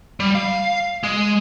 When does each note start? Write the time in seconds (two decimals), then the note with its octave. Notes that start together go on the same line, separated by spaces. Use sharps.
0.20 G3
0.35 F5
1.04 G#3